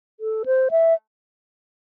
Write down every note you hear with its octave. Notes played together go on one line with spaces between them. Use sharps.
A4
C5
E5